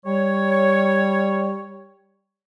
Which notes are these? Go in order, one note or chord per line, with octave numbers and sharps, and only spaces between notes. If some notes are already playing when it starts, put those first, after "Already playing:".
G3 C#5